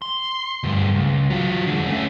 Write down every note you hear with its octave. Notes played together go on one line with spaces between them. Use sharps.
C6
D2 G2
C#2
F#3 F4
D3 G#3
A3 C#4